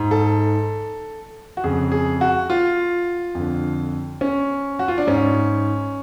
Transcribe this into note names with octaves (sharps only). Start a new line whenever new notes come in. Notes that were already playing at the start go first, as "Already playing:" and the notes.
Already playing: G#2
A4
F#4
F2 C#3 G#4
G#4
F#4
F4
F2 D3
C#4
F#4
F4
D4
G#2 C#4